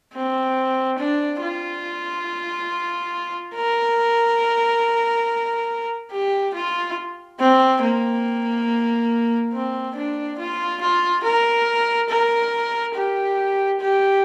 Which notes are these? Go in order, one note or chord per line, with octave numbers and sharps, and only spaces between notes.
C4
D4
F4
A#4
G4
F4
C4
A#3
C4
D4
F4
F4
A#4
A#4
G4
G4